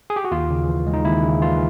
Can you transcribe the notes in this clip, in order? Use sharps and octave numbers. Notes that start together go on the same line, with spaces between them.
G#4
G4
F#4
D#2 F4
C#3
E3
G#3
D#4
D#2 E4
C#3
E3 F4